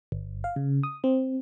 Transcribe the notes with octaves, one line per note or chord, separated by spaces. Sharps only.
G1
F5
C#3
D#6
C4